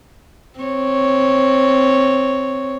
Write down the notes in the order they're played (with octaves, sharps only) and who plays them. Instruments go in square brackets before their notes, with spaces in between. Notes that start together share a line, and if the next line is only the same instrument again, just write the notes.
[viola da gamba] C4 C#5